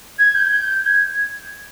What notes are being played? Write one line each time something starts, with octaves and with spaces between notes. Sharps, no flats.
G#6
G6
G6
G6
G#6